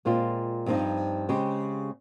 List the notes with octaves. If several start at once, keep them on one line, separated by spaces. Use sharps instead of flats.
A#2 G#3 C4 F4
G2 F3 C4 D#4
C#3 G#3 C4 G4